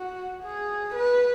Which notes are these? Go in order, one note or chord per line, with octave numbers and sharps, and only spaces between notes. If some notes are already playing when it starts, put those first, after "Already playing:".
Already playing: F#4
G#4
B4